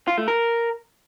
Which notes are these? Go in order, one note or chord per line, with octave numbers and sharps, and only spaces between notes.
F4
A3
A#4